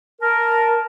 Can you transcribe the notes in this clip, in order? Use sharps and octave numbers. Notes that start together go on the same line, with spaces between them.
A#4 A5